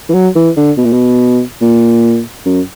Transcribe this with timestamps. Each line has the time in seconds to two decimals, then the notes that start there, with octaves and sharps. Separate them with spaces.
0.09 E3
0.14 F#3
0.35 E3
0.57 D3
0.77 B2
0.85 A#2
0.92 B2
1.61 A#2
2.46 F#2